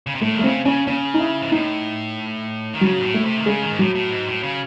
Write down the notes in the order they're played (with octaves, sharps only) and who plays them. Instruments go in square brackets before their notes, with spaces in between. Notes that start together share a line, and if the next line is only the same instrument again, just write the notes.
[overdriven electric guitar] C#3
C3
[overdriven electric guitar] A2 [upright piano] A3
[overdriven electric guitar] D#3
[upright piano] A3
[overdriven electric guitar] C#3 [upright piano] C4
[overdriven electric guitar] C#3 [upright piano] C#4
[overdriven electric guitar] C#3 [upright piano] C#4
[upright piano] D#4
E4
[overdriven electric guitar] G#2
[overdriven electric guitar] A2 [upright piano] D#4
[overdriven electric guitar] D#3
[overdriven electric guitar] C#3 [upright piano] F#3
[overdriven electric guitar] G#2
A2
[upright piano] A3
[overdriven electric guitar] C3
D#3
[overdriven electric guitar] C#3 [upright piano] G#3
[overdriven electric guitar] D#3
G#2
[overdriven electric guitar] A2 [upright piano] F#3
[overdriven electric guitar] A2
G#2
A2
C#3